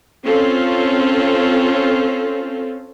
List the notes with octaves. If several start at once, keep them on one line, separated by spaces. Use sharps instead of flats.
C4 C#4 F4 A4